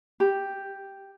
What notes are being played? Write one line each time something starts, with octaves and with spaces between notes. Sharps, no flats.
G4